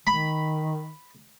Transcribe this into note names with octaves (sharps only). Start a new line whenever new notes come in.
D#3 B5